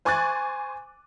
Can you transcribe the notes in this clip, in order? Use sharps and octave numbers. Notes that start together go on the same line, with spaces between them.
C5 G#5 C#6 D6 F#6 A6